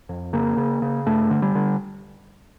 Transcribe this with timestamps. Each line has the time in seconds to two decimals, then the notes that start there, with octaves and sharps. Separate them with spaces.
0.09 F2
0.33 C#3 A#3
0.57 C#3
0.82 C#3
1.06 G2 A3
1.30 D3
1.42 G3
1.55 D3